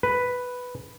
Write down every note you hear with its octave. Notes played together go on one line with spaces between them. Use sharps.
B4